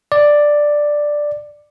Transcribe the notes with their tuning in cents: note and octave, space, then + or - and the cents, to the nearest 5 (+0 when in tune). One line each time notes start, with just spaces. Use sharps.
D5 +5